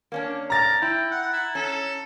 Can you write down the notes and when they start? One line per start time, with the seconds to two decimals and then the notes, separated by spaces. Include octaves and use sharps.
0.12 A#3 C#4 D4
0.50 A#4 A#5 A6
0.82 E4 G5
1.12 F#5
1.33 E4
1.55 C#4 A4